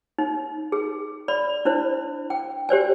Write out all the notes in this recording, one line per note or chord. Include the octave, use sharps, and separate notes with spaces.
D#4
G#4
D5 B5
D4 E4 C5
G5
G4 C5 D5 G#5